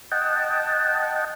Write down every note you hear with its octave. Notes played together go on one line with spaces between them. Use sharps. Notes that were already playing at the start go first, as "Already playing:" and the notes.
D#5 F#5 G5 A5